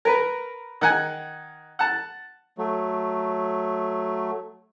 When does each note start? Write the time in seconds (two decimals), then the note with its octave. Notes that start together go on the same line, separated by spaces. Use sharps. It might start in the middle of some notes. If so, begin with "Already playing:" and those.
0.05 A#4 B4
0.81 D#3 F#5 G#5
1.79 F#5 A5
2.58 F#3 A3